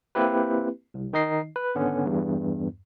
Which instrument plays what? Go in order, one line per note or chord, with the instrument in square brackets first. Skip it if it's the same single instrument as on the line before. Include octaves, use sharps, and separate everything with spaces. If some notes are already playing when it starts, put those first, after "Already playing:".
[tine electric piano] A#3 C4 E4 G4 B4
C2
D#3 D#4 D#5 C7
B4
G#1 D3 B3 C#4
E2 G2